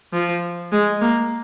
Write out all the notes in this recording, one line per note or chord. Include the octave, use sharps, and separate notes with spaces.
F3
G#3
A#3